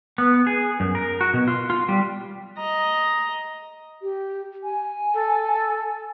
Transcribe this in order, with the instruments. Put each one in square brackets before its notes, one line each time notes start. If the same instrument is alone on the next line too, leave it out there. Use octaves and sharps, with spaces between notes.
[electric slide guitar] B3
G#4
F#2
A#4
F#4
B2
F4
F4
G3
[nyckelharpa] D#5 A#5
[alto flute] G4
G#5
[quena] A4